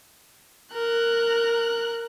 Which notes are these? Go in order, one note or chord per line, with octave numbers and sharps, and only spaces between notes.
A#4 F#6